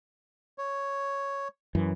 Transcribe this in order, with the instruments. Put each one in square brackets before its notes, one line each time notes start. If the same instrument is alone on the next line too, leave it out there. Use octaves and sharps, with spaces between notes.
[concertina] C#5
[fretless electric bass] F#2 E3